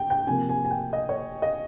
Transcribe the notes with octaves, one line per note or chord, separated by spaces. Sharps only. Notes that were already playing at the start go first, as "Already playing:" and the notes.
Already playing: G5
G5
C3 F3 A#3 G#5
G#5
G#5
G5
D#5
C#5
D#5